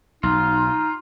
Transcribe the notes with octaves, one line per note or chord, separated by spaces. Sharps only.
B1 D#4 F4